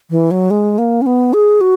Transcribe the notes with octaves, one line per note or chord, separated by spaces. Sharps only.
E3
F#3
G#3
A#3
C#4
B3
G#4
F#4